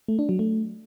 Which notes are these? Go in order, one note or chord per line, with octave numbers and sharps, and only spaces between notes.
A3
D4
F#3
A3